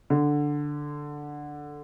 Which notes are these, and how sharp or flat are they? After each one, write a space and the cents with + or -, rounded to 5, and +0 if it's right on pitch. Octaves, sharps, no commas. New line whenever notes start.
D3 +0